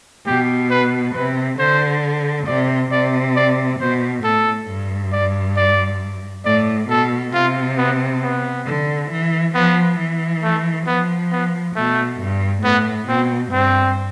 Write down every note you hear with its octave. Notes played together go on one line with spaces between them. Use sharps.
B2 G4
B4
C3 B4
D3 C5
C3 D5
C3 D5
D5
B2 C5
A2 A4
G2
D5
D5
A2 D5
B2 A4
C3 F4
B3
B3
D3
E3
F3 B3
E3
A3
F3 B3
B3
B2 A3
G2
A2 B3
B2 C4
G2 C4